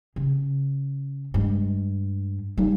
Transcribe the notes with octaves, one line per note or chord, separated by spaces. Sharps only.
C#3
G2 G#3
G3 D#4